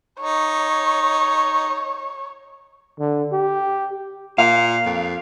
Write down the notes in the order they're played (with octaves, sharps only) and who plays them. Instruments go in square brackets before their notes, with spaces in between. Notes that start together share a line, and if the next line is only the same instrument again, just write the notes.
[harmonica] D#4 [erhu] C#5
[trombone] D3
G4
[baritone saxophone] A#2 [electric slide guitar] F5
[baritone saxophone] F2